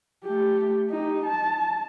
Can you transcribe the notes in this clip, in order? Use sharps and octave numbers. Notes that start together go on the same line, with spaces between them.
A3 G4
D#4 G4
A5